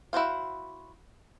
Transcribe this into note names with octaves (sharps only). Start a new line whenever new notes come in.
E4 F#4 C5 F5